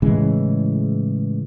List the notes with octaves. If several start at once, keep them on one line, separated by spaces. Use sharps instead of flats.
A2 C#3 E3 G#3